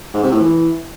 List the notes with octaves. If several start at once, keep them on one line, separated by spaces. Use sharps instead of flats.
G#2
C3
A2
E3